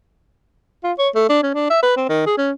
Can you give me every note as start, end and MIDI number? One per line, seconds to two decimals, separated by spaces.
0.84 0.93 65
0.98 1.09 73
1.15 1.29 57
1.29 1.38 62
1.43 1.53 61
1.54 1.66 62
1.70 1.82 76
1.83 1.93 71
1.97 2.09 60
2.09 2.26 51
2.26 2.33 68
2.38 2.52 61